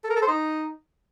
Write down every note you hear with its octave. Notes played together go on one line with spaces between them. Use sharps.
A4
A#4
A4
C5
D#4